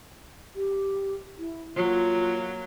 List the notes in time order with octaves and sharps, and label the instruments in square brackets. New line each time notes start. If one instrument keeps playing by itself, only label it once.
[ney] G4
E4
[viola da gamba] F#3 A#3 [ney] F4